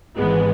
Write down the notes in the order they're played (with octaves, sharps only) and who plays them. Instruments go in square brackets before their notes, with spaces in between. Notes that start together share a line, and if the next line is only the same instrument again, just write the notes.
[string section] G#1 G#2 E3 G#3 B3